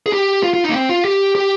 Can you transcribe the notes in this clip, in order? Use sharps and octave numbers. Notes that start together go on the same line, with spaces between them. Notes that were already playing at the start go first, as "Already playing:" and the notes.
G#4
G4
F4
F4
D#4
A#3
C4
F4
G4
G4